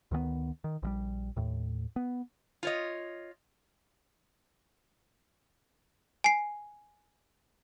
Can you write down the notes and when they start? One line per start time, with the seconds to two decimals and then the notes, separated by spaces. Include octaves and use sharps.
0.11 D2 D#3 E3 B3
0.64 D#3
0.83 A#1 E3 G3
1.36 D#2 A2
1.96 B3
2.63 F4 C#5 D#5
6.24 G#5 C7